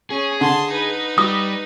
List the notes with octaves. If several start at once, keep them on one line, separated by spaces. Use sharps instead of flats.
C#4 G#4
D3 A5 C6
D#4 B4
G3 D#6